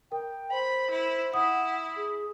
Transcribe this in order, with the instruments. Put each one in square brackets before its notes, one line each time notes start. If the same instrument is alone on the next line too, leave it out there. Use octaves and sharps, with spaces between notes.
[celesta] A#4 [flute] G5
[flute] C5 [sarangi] B5
[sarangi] E4
[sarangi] E4 [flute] F#5 [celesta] D#6
[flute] G#4